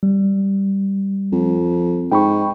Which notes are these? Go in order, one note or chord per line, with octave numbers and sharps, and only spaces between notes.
G3
F2
G#2 G5 B5 C#6